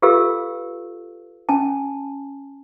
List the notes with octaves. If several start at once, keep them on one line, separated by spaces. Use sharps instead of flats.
F4 G4 A4 B4 F5 E6
C#4 G#5 A5